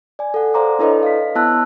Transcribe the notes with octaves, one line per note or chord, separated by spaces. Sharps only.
D5 G#5
A4 F#5
C5 D5 F5 A#5 C6 D6
D4 E4 A4 B4 C#5 D#5
F5 B6
B3 E4 A5 E6 F#6